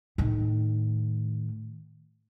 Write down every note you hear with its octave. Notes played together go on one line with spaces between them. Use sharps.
A2 D#3